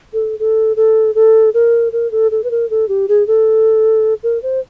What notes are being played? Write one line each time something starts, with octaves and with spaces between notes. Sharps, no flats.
A4
A4
A4
A4
A#4
A#4
A4
A4
B4
A#4
A4
G4
G#4
A4
A#4
C5